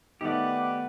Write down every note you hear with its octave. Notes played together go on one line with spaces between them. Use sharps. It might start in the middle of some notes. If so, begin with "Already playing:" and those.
D#3 A3 B3 G4 B4 D5 F#5